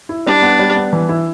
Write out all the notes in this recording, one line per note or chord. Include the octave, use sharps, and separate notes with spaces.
E4
G3 D4
B3
G3
B3
E3
E4